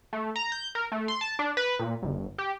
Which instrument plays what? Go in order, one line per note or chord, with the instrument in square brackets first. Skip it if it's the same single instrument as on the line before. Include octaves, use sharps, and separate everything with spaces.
[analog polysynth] A3
A#5
G6
A#4
A3
C6
A5
D4
B4
A#2
G1
G4